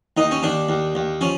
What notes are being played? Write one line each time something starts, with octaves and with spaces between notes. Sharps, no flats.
D#2 D#4
C#4
D#2 D4
D#2
D#2
F3 C#4